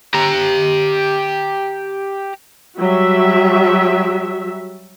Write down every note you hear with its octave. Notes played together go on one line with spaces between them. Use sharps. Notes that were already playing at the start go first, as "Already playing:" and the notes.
G4 A#5
F#3 G3 F#4 E5